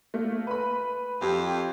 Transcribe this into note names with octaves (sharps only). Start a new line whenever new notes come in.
A3 A#3
B4 B5
F2 G4